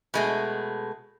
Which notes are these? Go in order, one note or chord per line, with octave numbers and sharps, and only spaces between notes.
B2 G#3 A3